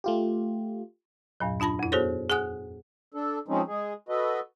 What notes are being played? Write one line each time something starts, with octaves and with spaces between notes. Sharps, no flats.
A3 F4 G4
E2 G2 A#2 F#3
D4 F4 A5 B5 A#6
F2 E4
B3 F#4 G#4 A4 C5 C#5
G#4 F#5 G#5 D#6 F#6
D4 A4
F3 G#3 C4 C#4 D#4
G#3 G#4
F#4 A4 B4 D#5